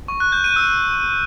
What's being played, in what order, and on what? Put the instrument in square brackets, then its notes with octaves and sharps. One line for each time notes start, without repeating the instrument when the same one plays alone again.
[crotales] C#6
F#6
G6
D#7
E6